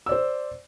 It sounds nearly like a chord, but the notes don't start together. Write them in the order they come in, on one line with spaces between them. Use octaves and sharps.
E6 D5 C5